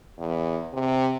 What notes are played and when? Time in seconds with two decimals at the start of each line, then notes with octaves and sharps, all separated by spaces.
0.18 E2
0.73 C3